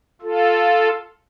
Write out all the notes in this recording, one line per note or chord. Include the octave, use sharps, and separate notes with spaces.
F4 A4